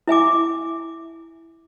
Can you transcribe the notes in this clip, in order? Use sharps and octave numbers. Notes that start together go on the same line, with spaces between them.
E4 E5 G#5 D6